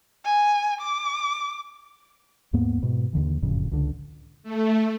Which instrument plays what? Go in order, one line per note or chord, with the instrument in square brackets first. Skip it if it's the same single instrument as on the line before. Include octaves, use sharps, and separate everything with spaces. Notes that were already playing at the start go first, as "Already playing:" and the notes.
[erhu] G#5
D6
[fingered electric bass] D#2 G#2 A#3 B3
G#2 B2
D#2 D3 E3
F#1 F2 A2 C#3
C#2 D3
[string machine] A3